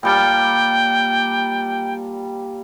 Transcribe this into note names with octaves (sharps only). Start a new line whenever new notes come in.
A#2 G3 G5 A5